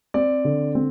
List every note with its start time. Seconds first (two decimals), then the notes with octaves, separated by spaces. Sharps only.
0.14 C4 D5
0.45 D3
0.75 C4